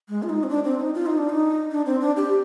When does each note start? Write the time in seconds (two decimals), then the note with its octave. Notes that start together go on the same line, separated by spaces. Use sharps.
0.09 G#3
0.23 F4
0.29 D#4
0.43 C4
0.49 D4
0.64 C4
0.79 D#4
0.95 F4
1.06 D#4
1.18 D4
1.29 D#4
1.71 D4
1.86 C4
2.01 D4
2.17 G4